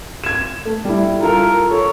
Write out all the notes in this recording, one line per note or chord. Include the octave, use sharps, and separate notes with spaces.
G#6 E7
A3
G3 E4
F4 A4 A#4
A4 C#5